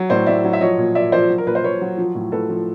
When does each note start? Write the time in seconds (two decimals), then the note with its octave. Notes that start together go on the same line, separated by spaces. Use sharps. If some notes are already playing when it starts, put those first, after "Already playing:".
Already playing: F#3
0.09 A2 C5 D5
0.26 A2 D5 E5
0.44 F#3
0.53 E5
0.61 F3 C#5 D#5
0.78 A#2
0.95 A#2 D5 E5
1.12 F3 C5 D5
1.29 F#3
1.38 A#4
1.47 A#2 B4
1.55 C5
1.64 A#2 B4 C#5
1.81 F#3
1.97 F3
2.15 A2
2.32 A2 A4 B4
2.50 F3